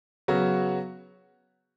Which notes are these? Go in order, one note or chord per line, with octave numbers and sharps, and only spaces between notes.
C#3 F#3 B3 F#4